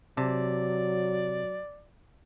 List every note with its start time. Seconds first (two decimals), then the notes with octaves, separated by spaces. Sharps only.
0.17 C3 F#3 D5 A5